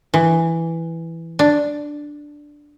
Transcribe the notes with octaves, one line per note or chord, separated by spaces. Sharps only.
E3
D4